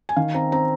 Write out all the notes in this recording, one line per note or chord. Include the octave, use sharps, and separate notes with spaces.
G#5
D#3 F5
C4 A#5
C4 A#5